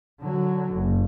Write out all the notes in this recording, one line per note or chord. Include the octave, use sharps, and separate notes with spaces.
D3 F#3
F#1